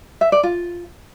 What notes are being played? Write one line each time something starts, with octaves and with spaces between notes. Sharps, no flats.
E5
D5
F4